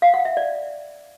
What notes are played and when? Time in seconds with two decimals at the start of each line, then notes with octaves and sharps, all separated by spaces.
0.02 F5
0.14 F#5
0.25 E5
0.37 D5